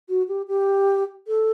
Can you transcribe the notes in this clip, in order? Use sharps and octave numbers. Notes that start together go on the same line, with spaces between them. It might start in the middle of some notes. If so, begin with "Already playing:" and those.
F#4
G4
G4
A4